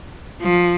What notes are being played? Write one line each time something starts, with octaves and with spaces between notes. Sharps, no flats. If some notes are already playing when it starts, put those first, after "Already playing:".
F3